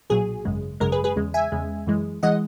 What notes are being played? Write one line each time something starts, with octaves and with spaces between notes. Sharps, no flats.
B1 A#2 F#3 G#4
G#1 F#2 C#3 G#3
G#1 F#2 C#3 G#3 A#4
G#4 B4
G#4 B4
E2 C#3 G#3
E5 G#5
E2 C#3 G#3
F#2 E3 G#3
E3 G#3 D#5 F#5